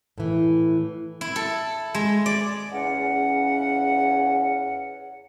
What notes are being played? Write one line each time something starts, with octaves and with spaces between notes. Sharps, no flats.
A2 E3
E4
A4
G#3
D5
E2 C#3 C#4 F#5